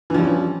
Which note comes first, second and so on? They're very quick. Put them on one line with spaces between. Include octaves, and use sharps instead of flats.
E3 F3 G3 C#4